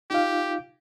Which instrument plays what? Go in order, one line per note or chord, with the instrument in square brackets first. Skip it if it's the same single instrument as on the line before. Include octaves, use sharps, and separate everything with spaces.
[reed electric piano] D#4 F4 F5 [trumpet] G4